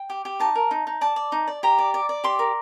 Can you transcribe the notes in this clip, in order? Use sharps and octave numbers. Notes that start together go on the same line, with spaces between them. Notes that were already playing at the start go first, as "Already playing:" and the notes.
Already playing: G5
G4
G4
D#4 A5
A#4
D#4
D#4
D5 A5
D5
D#4
D5
G4 A#5
D5
D5
D5
G4 C6
A#4